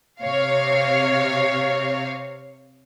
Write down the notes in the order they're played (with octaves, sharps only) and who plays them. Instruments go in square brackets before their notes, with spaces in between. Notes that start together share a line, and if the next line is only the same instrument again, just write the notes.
[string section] C3 C#5 F5